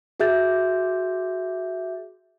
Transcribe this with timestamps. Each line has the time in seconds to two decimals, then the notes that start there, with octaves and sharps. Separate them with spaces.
0.20 F#4 G#4 E5 G6 A6